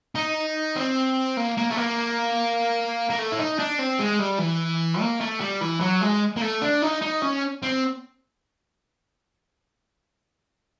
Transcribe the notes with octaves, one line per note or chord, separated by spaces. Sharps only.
D#4
C4
A#3
A#3
A3
A#3
A#3
A3
E4
D#4
D4
C4
G#3
G3
E3
A#3
A3
G3
E3
F#3
G#3
A#3
A3
D4
D#4
D#4
C#4
C4